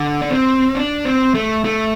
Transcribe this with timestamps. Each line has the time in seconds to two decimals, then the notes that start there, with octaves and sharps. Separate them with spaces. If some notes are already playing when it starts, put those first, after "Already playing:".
Already playing: D3
0.21 D4
0.30 C4
0.75 D4
1.05 C4
1.34 A3
1.64 A3